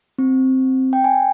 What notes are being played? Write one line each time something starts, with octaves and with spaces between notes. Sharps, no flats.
C4
G5
G#5